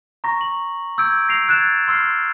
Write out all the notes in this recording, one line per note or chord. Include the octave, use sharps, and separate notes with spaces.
A#5 C#6 A#6
F#7
D6 E6 G6 G#6 D7
A#6 C7 D7 F7
F#6 G#6 A6 E7
C6 E6 F6 C7